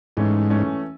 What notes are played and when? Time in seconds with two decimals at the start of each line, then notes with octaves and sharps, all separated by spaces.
0.17 G#2 E3 A3 C#4
0.50 E3 A3 C#4